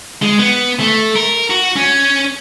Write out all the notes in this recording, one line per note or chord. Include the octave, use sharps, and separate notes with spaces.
G#3
B3
A3
A#4
F#4
C#4